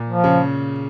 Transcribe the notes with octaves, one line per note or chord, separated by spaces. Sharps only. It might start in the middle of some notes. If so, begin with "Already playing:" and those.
Already playing: A#2
F3
C#3